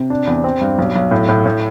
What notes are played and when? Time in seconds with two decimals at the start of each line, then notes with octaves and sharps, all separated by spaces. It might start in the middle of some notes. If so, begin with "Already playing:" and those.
Already playing: C3
0.10 D4
0.27 E2
0.44 C4
0.61 G2
0.79 B1
0.95 B1
1.11 A2
1.29 A2
1.46 A2